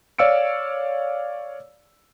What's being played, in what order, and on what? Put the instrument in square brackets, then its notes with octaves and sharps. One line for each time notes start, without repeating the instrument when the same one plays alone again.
[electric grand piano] C#5 D5 F5 E6 C#7 D7